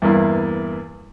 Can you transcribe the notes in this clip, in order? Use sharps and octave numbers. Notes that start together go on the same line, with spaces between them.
E2 G2 A#3 E4